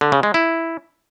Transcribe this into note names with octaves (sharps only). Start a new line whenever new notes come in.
D3
C#3
G#3
E4